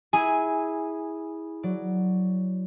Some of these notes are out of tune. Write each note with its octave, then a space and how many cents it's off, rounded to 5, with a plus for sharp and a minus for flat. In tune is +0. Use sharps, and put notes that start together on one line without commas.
E4 -20 G#4 -10 G#5 +0
F#3 +0 D5 +0